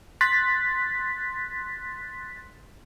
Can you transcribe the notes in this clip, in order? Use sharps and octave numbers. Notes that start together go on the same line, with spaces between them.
C6 F#6 A6 B6